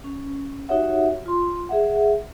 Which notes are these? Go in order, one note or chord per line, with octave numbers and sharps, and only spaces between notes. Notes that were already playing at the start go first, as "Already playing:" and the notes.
C#4
D#4 F#4 G4 C#5 E5 F#5
F4 C6
G#4 E5 F#5